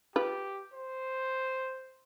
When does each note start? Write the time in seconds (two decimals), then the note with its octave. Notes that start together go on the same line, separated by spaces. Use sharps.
0.16 F4 G4 B4
0.74 C5